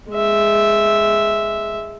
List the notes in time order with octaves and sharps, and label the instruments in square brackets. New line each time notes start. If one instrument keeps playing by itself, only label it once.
[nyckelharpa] G#3 E5